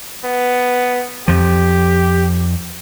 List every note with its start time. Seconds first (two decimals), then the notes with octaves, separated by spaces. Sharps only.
0.25 B3
1.28 F2 F3 G4